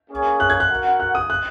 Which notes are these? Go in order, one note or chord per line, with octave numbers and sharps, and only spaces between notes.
A#3 C#4 G#4 C#5
F#6
G#6
F#6
F#4 A#4 F#5
F#6
D#6
F#6